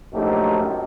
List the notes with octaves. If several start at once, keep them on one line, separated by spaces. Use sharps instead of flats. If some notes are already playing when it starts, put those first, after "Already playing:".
A#1 F#2 A3 D#4 G4